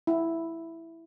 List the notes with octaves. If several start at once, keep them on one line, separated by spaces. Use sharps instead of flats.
E4